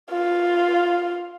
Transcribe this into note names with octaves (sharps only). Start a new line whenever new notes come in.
F4